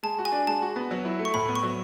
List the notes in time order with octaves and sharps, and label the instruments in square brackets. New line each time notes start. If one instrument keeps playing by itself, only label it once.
[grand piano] G#3 [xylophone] A5
[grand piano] F#4
[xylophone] G#5
[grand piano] D4
[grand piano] G#3 [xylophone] A5
[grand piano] F#4
B3
F#3
E4
A3
[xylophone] C#6
[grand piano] A2 [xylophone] B5
[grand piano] B3
[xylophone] C#6
[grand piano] F#3